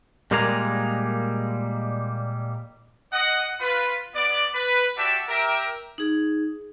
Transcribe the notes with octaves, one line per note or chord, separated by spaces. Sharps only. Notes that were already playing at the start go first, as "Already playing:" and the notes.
A#2 G3 G#3 A#3 G#4 A#5
D#5 F#5
F4 B4
B3 D5
B4
F#4 G4 D5 E5 G5 A5
G4 A#4 E5
D#4 G#4